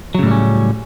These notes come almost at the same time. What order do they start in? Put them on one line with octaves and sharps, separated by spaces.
F#3 C#3 A2 G3 C#4